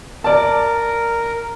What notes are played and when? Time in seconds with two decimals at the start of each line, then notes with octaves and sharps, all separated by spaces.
0.24 A#4 D5 A5